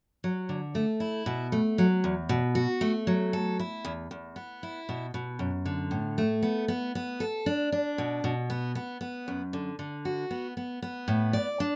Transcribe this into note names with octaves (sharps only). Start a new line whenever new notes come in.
F#3
D3
A3
E4
B2
A3
F#3
E2
B2
F#4
A3
F#3
A4
E4
E2
E2
B3
E4
B2
B2
F#2
D3
A2
A3
B3
B3
B3
A4
D4
D4
B2
B2
B3
B3
B3
F#2
D3
D3
F#4
B3
B3
B3
A2
D5
D4